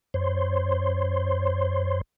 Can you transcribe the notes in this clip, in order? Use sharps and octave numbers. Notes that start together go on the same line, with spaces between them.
F#2 C5 C#5 C6